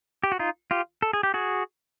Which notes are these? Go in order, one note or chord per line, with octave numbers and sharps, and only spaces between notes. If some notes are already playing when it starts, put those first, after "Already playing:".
G4
F#4
D#4 F4
F4 G4
A4
G#4
G4
F#4 G#4